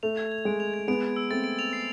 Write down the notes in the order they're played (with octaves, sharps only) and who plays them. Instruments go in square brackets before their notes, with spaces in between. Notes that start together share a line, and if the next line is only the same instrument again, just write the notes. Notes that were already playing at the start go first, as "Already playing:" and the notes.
[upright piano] A3 [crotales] F7
[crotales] G#6
G#6
[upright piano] G#3 [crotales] D7
[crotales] F7
G#6
[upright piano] G#3 B3 [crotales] D7
[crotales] F7
E6
[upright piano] A3 C4 [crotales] A6
[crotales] D7
F7
C7